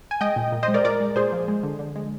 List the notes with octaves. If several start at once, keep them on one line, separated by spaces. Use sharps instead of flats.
G#5
G#3 D#5 G5
A#2
A#2
C5 D#5
G#3
A#4 D5
A#2 A#4 D5
G#3
A#2 G#4 C5
F3
G#3
D3
D3
G#3